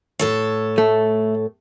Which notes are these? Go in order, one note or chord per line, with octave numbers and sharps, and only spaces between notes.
A2 A4 C#5
A3